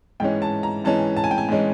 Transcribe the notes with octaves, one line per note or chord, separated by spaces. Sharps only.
G#2 E3 G#3 C#4 G5
A5
A#5
G#2 E3 G#3 C#4 A5
A5
G#5
G5
G#5
G#2 E3 G#3 C#4